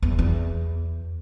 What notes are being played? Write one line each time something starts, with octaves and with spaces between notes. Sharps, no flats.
E2
E2